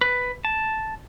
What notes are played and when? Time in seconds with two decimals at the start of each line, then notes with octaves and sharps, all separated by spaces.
0.01 B4
0.45 A5